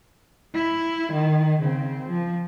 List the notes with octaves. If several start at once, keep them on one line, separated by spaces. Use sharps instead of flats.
E4
D#3
C#3 C4
F3